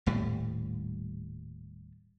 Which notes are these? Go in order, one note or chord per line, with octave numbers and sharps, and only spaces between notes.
D#1 A2 G3